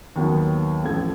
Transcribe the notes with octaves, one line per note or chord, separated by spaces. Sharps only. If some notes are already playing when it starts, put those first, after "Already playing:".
D#2 D#3 F#3 B3
A1 F2 A4 G#6